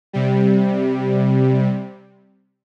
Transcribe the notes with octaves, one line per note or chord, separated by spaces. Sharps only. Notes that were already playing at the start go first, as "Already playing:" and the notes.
C3 G3